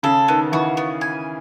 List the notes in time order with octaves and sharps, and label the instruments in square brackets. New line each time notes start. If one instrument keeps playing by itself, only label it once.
[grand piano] C#3 [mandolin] A4
[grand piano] D#3 [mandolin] B3
[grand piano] E3 [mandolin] F#4
[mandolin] B3
G#5